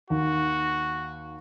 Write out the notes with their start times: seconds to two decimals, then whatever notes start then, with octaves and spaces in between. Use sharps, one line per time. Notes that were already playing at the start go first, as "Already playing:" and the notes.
0.10 D#2 F#4